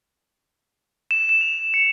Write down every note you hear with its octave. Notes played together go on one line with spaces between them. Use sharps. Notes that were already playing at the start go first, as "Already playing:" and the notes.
E7
E7
F7
C#7